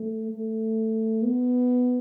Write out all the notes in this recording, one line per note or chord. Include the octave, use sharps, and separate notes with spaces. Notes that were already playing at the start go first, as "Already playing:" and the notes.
Already playing: A3
A3
B3